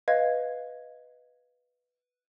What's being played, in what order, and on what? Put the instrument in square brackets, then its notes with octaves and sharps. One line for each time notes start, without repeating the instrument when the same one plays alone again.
[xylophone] B4 D#5 F5 G#6